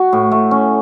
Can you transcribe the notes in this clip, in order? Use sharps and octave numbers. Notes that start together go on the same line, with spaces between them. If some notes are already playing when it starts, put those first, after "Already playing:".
Already playing: F#4
A2
A3
C#4